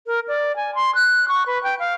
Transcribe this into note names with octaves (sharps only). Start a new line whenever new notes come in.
A#4
D5
G#5
C6
F#6
C#6
B4
G5
F5